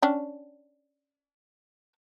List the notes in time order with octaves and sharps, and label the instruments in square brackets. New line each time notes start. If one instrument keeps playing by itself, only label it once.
[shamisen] C#4 D4 G5